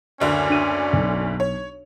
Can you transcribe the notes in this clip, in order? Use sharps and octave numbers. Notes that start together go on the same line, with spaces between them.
F#1 D2 D3 C#4 D5
D4 D#7
B1
C#5